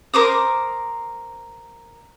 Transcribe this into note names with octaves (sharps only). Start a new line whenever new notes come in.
A#4 C5 D6 D#6